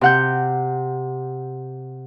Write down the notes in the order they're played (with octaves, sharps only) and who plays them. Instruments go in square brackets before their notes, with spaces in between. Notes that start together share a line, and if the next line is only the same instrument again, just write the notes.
[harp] C3 F#5 G6